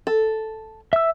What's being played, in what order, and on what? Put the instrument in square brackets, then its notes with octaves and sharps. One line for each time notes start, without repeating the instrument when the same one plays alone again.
[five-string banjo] A4
[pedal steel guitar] E5 E6